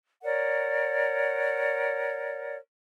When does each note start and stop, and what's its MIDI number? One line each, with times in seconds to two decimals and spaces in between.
0.23 2.57 70
0.23 2.57 73
0.23 2.57 74
0.23 2.57 78